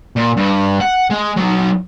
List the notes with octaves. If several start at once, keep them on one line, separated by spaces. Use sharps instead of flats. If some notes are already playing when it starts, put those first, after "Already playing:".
A#2
G2
F#5
G#3
F#3 D#4